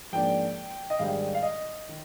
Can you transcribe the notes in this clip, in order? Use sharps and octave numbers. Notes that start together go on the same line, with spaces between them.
G#2 F3 A#3 D4 G5
D#5
G#2 D#3 G3 D4 F5
F5
D#5
D#3